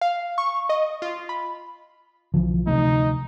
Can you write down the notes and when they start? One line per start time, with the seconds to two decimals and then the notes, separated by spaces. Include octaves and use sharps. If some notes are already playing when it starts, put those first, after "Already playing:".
0.01 F5
0.38 C#6
0.69 D#5
1.02 F4
1.29 B5
2.34 B1 D3 E3 F3
2.67 D2 C3 A3 D#4